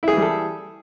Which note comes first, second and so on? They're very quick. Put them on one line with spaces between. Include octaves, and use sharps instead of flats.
E4 G#4 E3 G3 A4